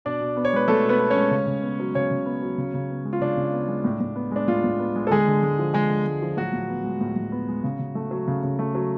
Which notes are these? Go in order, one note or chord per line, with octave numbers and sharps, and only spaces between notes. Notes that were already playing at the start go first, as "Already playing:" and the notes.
B2 D4 D5
B2
B3
C#5
G#3 B4
B2 A3 A4
B2 B3 B4
B3
C#4 C#5
G#3
C#3
C#3
B3
F#3
C#3 C#4 C#5
C#3
B3
F#3
C#3
C#3
B3
G#3
F4
C#3 D4
C#3
B3
G#3
A2
A2
B3
G#3 D4
A2 F4
A2
B3
G#3
A4
D3 G#3 G#4
D3
G#3
F3
D3 G#3 G#4
D3
G#3
F3
A2 F#3 F#4
A2
B3
G#3
A2
A2
B3
G#3
C#3
C#3
A3
F#3
C#3
C#3
A3
F#3